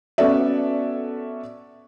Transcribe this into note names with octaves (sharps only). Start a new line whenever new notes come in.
B3 C#4 F#4 A4 D5 E5